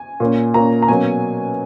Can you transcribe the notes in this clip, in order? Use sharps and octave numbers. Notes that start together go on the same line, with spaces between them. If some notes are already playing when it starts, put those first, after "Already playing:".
Already playing: G#5
A#2 A#3 C#4
A#2 A#3 C#4 A#5
A#5
B2 F#3 A#3 C#4 G#5